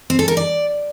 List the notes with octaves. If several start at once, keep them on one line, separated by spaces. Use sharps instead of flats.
C4
A4
A#4
D5